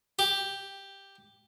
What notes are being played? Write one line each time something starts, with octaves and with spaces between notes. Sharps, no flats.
G4